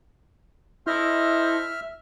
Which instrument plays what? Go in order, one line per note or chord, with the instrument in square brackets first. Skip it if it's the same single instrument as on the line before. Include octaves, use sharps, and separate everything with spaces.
[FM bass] E4 [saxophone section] A4 C5 D#5 [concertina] E5 F6